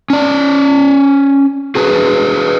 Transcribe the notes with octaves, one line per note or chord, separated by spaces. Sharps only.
C#4 D5
F#4 G#4 B4